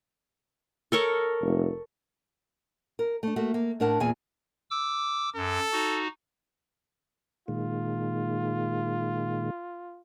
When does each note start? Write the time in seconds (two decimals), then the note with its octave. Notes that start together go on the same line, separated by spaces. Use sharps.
0.92 A4 A#4 C#5
1.42 F1
2.99 A#4
3.23 A3 D4
3.36 A3 A#3 F#4
3.54 A#3
3.80 A2 D4 A#4 F#5 A5
4.00 E2 A#2 G#4 G#5
4.71 D6 E6
5.36 F#2 A4
5.73 D#4 F#4
7.48 A#2 D#3 G#3 F4